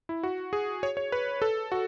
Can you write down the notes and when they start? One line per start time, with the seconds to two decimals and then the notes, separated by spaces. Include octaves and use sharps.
0.09 E4
0.23 F#4
0.53 G#4
0.83 C#5
0.97 C#5
1.12 B4
1.42 A4
1.72 F#4